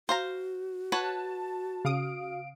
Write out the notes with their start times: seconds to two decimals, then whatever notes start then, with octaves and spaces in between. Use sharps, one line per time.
0.09 F#4 C5 F5 A#5
0.92 B4 C#5 F#5 A5
1.85 C#3 F5 D#6 D7